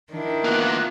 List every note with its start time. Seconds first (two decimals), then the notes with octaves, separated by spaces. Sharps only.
0.12 D#3 D4 E4
0.44 A#3 B3 F4 F#6